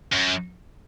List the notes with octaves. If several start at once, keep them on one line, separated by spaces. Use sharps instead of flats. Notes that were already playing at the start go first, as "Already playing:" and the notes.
F#2